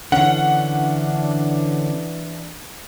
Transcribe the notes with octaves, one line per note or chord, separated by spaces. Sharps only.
D3 E3 C#4 D4 F#5